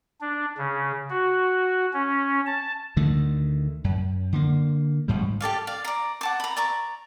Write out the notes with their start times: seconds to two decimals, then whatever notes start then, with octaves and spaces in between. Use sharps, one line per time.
0.21 D4
0.58 C#3
1.10 F#4
1.93 C#4
2.47 A5
2.96 D2 D3 D#3 A3
3.84 F#2
4.33 D3 A#3
5.08 A1 G#2 G3
5.40 G4 A4 D5 F5
5.67 D5 F5
5.84 D5 A#5
6.21 F#5 A5 D6
6.40 A#5 B5
6.57 D5 A#5 C#6